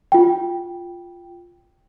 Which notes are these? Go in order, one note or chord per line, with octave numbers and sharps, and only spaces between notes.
F4 G5